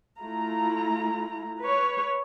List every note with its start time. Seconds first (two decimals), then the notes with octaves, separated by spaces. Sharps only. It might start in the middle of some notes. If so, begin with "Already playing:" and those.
0.18 A3 E4 F4 A#5
1.61 B4 C#5